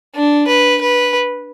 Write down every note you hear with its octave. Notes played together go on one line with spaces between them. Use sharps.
D4
B4
B4